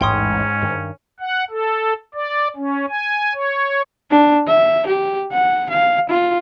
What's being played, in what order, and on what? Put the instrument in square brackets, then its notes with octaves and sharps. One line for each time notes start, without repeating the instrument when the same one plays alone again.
[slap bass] A1 E2 [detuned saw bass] G#2 [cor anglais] C#4 [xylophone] G5 C6 D#6
[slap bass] G2 D#3
[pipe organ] F#5
A4
D5
C#4
G#5
C#5
[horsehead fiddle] D4
E5
G4
F#5
F5
F4